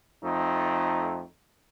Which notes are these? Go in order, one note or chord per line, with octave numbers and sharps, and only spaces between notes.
F2 A3 D#4